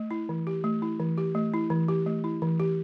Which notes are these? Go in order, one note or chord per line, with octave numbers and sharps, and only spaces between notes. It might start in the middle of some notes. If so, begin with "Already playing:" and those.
Already playing: A3
E4
E3
G4
A3
E4
E3
G4
A3
E4
E3
G4
A3
E4
E3
G4